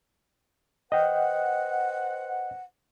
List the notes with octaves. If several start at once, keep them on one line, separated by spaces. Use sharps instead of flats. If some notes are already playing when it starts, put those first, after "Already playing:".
B4 C5 D#5 F#5 G5